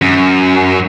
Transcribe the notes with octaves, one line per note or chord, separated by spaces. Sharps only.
F#2